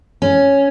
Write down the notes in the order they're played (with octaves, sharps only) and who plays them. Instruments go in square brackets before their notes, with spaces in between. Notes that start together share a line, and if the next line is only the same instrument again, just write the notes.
[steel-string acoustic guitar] C#4